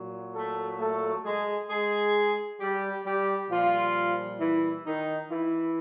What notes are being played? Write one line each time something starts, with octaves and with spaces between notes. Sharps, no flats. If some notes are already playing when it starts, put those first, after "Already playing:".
Already playing: A#2 F#3
A3 A4
A3 A4
G#3 G#4
G#3 G#4
G3 G4
G3 G4
A#2 F3 G3 F4
E3 E4
D#3 D#4
E3 E4